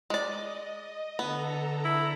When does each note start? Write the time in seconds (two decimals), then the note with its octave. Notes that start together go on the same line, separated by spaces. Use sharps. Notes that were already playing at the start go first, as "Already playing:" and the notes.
0.10 G#3 D5 D#5
1.19 D3 B3 A4 A#5
1.85 E4